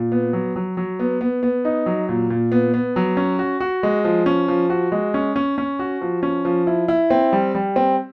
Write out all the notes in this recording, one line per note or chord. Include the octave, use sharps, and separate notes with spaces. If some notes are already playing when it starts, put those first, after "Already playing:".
Already playing: A#2
B3
F#3
F#3
F#3
B3
B3
B3
D#4
F#3
A#2
A#2
B3
B3
F#3
C#4
F#4
F#4
G#3
F3
C#4
F3
F#4
G#3
C#4
C#4
C#4
F#4
F3
C#4
F3
E4
E4
C4
G3
G3
C4